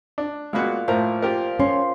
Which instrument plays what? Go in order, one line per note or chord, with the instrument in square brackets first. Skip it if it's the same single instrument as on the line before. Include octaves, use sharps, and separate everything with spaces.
[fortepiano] D4
[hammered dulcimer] A#2 F5 [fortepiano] G#3 B3 F#4
[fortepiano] A2 A#4 A#5 [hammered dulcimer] F3
[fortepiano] F4 G4 A#4
[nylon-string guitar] C#4 [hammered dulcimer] C6